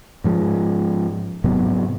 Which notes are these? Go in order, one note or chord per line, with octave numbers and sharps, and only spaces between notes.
G#2 F3 G#3
G#2 C3 F#3 B3